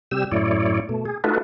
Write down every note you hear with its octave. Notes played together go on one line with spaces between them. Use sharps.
C3 G3 G4 E6
F#2 A2 E4 C#5 D5
B2 A3
G#4
A3 D#4 F4 F#4 A4 B4